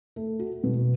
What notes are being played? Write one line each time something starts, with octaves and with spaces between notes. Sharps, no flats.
A3
F#4
B2